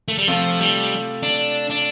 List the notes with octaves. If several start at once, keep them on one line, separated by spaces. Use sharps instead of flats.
A3
G3
C3 F3 A3 F4 A4
G3
D4
D4